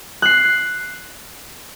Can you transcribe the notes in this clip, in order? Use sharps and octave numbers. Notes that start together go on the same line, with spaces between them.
F#6 C7